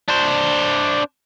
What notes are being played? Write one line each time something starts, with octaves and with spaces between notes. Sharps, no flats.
D4 C5